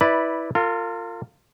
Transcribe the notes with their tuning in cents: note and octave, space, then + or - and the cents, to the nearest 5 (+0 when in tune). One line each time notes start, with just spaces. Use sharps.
E4 -15 B4 +0 D5 +0
F4 +0 A#4 -45